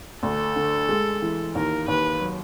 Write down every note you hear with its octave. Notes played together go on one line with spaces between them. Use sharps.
D2 A4
D3
G#3
E3
D#2 A#4
D#2 B4
F#3